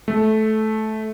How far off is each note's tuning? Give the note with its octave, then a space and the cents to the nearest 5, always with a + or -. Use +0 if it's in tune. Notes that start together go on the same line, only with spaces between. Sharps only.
A3 -15